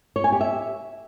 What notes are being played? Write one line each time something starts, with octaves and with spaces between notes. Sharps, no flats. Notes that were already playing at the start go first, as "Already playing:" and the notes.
C#5
G#5
G4
E5